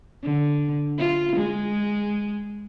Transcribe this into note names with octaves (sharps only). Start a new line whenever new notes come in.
D3
F4
G#3